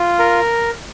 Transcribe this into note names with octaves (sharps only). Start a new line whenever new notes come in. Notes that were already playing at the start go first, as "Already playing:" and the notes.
Already playing: F4
A#4